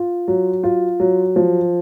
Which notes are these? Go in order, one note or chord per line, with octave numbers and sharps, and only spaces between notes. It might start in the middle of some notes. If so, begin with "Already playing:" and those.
Already playing: F4
F#3
F4
F#3
F3